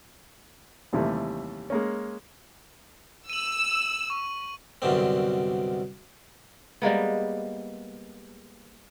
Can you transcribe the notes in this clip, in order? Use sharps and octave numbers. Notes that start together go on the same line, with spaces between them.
D#2 C3 E3 G3 A3
G#3 A#3 C#4
E6 D#7 F#7
C#6 D#7
C2 F#2 B2 D3 C4
G3 G#3 A#3 B3